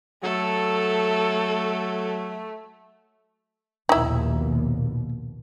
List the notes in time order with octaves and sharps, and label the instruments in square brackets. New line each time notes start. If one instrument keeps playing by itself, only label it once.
[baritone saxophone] F#3 [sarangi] A3 [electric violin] A4
[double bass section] A#1 D#2 B2 [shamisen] D#4 E4